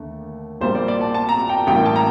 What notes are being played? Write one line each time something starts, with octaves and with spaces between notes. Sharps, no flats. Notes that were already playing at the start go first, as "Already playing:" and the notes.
Already playing: D#2 D3 A3
A#1 A#2 G3 A#3 C5
D5
D5
A5
A5
A#5
A5
G5
A1 A2 G3 A#3 G5
A5
A#5